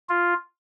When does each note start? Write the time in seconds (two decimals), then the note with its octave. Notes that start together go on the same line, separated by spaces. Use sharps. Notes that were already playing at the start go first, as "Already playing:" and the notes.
0.09 F4